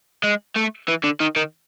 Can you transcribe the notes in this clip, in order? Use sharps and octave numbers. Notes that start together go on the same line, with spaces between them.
G#3
A3
E3
D3
D#3
D#3